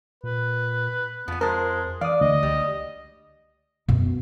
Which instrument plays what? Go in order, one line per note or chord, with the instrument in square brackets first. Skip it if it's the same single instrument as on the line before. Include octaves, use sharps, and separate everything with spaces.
[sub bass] A#2 [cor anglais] B4
[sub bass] F2 [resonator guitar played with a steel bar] F3 G#5 [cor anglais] B3
[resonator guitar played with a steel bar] F3 C5 [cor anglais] G#3 [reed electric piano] A#4 A5
[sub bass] E3 [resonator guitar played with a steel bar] D5 [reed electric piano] F5 D#6
[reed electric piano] D2 [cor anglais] D#5
[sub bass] C#2 [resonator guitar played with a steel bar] G3
[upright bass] F#2 C#4 [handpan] B2